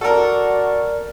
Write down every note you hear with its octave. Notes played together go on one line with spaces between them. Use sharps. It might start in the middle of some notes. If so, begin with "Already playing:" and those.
F#4 A4 A#4 D5